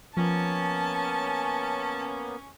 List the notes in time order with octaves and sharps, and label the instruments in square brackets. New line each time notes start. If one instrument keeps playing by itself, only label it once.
[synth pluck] F3 [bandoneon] A#3 B3 [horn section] C#4 [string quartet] A5